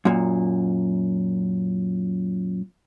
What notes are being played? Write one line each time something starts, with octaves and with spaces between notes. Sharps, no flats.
F#2 A#2